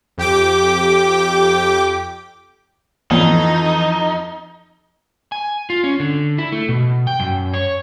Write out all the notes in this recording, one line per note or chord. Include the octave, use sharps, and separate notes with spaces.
F2 G4 G5 D6
F2 E3 D#4
G#5
F4
C#4
D3
E4
A3
B2
G5
F#2
C#5